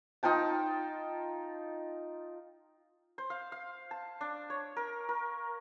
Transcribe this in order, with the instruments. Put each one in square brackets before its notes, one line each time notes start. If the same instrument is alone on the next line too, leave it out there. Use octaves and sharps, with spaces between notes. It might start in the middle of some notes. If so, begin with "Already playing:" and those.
[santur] D#4 F4 G5 A5
C5
F5
F5
A5
D4
C#5
A#4
A#4